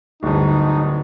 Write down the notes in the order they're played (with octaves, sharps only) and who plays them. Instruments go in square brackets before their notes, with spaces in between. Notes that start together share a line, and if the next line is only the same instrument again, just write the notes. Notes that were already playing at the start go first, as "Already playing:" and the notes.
[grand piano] D1 G2 [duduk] D#4